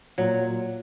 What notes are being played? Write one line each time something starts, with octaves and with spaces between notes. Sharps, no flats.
A#2 F#3